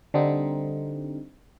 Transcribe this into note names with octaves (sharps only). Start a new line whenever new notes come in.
D3 G3 C4 D#4